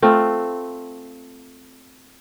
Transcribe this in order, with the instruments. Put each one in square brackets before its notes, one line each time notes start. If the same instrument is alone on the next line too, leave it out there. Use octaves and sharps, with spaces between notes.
[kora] A3 C4 F4